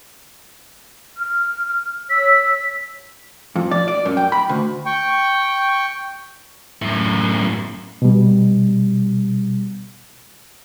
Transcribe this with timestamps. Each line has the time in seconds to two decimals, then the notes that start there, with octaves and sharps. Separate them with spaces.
1.17 F6
2.10 C#5 E6 B6
3.56 F2
3.71 D5
3.88 D5
4.05 F#2
4.17 G5
4.32 B5
4.49 D2
4.86 G5 C#6
6.82 F#2 A2
8.02 B2 G3